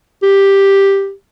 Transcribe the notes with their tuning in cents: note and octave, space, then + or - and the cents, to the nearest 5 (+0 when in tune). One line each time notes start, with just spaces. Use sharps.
G4 +5